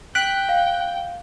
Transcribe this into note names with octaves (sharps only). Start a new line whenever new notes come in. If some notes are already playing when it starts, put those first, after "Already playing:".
G5 F#6 B6 D7
F5